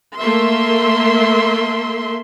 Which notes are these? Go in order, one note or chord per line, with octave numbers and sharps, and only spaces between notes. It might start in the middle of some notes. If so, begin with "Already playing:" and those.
A3 A#3 E5 C6